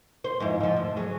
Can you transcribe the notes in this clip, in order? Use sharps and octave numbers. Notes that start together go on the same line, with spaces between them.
C5
F2 G#2 E4
G#2 F3
D2
F#3 G#4